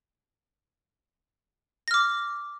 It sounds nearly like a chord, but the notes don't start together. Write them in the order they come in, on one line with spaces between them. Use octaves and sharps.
A#6 F6 D6